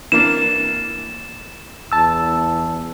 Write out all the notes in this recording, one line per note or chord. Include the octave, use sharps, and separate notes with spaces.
E3 A#3 D4 E7
E2 A5 E6